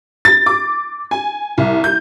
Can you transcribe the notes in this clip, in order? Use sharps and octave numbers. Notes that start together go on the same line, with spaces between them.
A6
D6
G#5
C2
G6